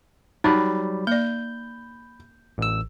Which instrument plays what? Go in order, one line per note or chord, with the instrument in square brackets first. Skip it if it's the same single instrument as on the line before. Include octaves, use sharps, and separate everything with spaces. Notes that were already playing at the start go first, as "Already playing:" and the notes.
[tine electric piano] F#3 G3 D5 [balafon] D#4 [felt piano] B5
[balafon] A#3 D5 [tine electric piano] G6
[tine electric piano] A1 E6